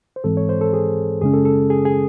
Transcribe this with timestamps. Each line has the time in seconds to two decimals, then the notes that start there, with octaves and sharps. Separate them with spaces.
0.16 C5
0.24 G#2 E3 G#3 C4 A4
0.37 C#5
0.49 C5
0.61 A4
0.73 G#4
1.21 F#2 C#3 G#3 C#4 G#4
1.34 A4
1.45 A4
1.70 G#4
1.85 G#4